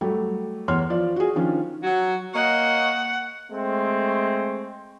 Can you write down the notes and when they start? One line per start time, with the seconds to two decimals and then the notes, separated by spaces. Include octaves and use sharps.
0.01 F#3 G3 A3
0.68 E2 C#5 C6 F6
0.90 F3 D5
1.16 F#4 G#4
1.36 D#3 F3 C#4 D4
1.83 F#3 F#4
2.34 A#3 C#5 D#5 F#5
3.52 G#3 A3 C4